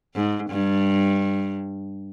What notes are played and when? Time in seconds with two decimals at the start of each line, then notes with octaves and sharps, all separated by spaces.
0.15 G#2
0.50 G2